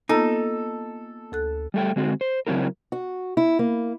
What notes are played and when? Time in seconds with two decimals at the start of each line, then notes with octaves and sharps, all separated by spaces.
0.09 A#3 B3 D#4 F4 A4
1.32 D2 A4 F#6
1.74 G3 A3 G5
1.96 D3 G#3 C4 F#4
2.21 C5
2.47 C#3 F#3 C4 E4 A#4
2.92 F#4
3.37 E4
3.59 A#3